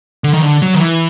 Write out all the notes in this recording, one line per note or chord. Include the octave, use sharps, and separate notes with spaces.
D3
D#3
D3
F#3
D#3
E3